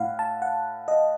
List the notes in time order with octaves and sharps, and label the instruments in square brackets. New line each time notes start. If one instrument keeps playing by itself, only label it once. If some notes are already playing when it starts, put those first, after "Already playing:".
Already playing: [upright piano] A2 [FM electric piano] F5 F#5
[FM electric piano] A5
F#5
D#5